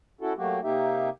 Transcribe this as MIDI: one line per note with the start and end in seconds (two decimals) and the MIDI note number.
0.21 0.33 61
0.21 0.33 64
0.21 0.33 66
0.21 0.33 69
0.37 0.60 54
0.37 0.60 57
0.37 0.60 58
0.37 0.60 66
0.37 0.60 67
0.64 1.09 48
0.64 1.09 58
0.64 1.09 63
0.64 1.09 67
0.64 1.09 76